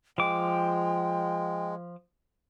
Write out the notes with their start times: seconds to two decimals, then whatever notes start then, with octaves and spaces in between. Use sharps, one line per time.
0.18 F3 G#3 G5 D6